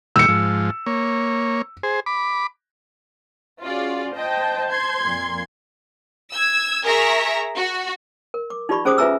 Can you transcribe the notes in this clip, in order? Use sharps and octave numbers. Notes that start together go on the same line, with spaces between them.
A#2 D#3 G3 E6 C#7
G#2 F3
A#3 C#5
G#4 C5
B5 D6
C#4 F4 F#4 G#4 D5
C5 D#5 G5 A5 G6
C6 G#6
F2 A#2
E6 G#6
G#4 A#4 E5 A#5 C#6 B6
F#4
A#4
D6
D#4 F4 G4 D5 B5 C#6
C#4 G#4 C5 D6 D#6
F4 B4 E5 G#5 A#5 E6